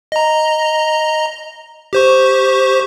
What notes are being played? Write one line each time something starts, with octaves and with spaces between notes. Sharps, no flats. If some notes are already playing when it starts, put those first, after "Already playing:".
D#5 A#5
G4 C5 C#6